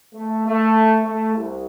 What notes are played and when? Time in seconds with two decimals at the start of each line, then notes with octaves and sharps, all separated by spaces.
0.14 A3
0.46 A3
1.04 A3
1.35 C2